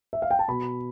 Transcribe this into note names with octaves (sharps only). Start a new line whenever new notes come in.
E5
F5
G5
A5
B2 B5